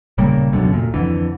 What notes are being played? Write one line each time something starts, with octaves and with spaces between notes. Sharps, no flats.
D#1 C#3 G3 A#3
C#2 F#2 B2 D3
D2 A#2
F2 D3 E3